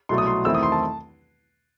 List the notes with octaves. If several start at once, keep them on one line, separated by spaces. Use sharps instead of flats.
C2 B2 F#3 A3 C6
D#6
C6
E2 D#3 A3 C4 E4 E6
D#6
C6
A5